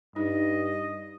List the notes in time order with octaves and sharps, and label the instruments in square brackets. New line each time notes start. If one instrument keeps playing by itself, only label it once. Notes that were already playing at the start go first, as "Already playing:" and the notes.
[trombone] G2 [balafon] D#4 [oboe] D#5